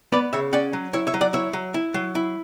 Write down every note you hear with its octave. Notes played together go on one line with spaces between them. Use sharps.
B3 B4 D5
C#3 C#5 E5
C#4 D5 F#5
F#3
E4 C#5 E5
C#5 E5
F#3
D5 F#5
E4 C#5 E5
F#3
E4
F#3
E4